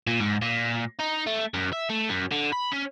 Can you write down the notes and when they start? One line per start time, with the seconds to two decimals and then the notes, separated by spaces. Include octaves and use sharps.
0.07 A#2
0.20 G#2
0.42 A#2
0.99 D#4
1.27 A3
1.54 F#2
1.73 E5
1.89 A3
2.09 F#2
2.31 D3
2.52 B5
2.72 C#4